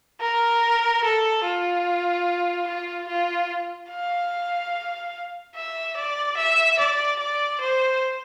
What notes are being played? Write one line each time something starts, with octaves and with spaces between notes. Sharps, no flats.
A#4
A4
F4
F4
F4
F5
E5
D5
E5
D5
D5
C5